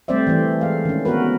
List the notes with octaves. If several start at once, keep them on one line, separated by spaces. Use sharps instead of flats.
G3 A3 C4 C5 D5 E5
E3 A3
G#3 F5
D#3 C#4
B3 F#4 A#4 B4